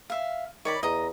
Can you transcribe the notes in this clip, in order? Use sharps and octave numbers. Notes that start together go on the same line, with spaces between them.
E5 F5
D#3 C#5 D5 B5
E2 D#5 A#5